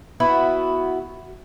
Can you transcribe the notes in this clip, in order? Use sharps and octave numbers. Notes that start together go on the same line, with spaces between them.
B3 E4 F#4